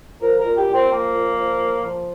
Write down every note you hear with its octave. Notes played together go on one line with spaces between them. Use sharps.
F3 A#4
A#4
A#2
G4
A#2
C4
F3 A#3
A#2
F3
A#2
F3